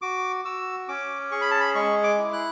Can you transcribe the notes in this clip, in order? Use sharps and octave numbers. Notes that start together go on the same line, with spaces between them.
F#4 D6
F#4 E6
C#4 D6
G#4 C#6
B5
A5
B5
G#3 C#6
D6
E4
F#6